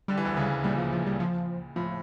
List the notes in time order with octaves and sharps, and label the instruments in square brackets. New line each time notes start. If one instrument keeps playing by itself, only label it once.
[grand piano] D3 [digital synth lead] G3
[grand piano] E3
D2 D3
C#2 C#3
[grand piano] A#2 [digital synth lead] G3
[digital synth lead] F3
F3
G3
F3
[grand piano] A2 [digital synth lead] F3